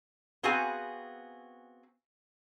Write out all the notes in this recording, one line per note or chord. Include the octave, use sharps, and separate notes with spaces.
B3 C4 F#4 G#4 F5 G#5